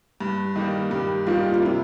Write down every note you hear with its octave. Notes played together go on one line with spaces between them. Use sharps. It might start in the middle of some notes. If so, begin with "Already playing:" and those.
G2
D#3 G3 A#3
G2 G4
D#3 G3 A#3 F4
F4
C3 E4